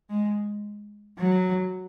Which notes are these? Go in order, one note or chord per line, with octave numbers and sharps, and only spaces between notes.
G#3
F#3